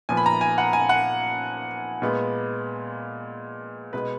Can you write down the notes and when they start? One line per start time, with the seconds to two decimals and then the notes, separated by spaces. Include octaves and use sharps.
0.09 A#2 F3 B3 G#5
0.17 B5
0.26 A#5
0.41 G#5
0.58 F#5
0.73 G#5
0.89 F#5
2.02 A#2 G#3 B3
3.93 B2 G#3 B3 B4